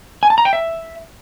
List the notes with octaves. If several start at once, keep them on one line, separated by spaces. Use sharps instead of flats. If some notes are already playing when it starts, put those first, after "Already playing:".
G#5
A5
A#5
G5
E5